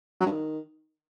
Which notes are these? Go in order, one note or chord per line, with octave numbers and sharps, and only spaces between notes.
F#3
G2
D#3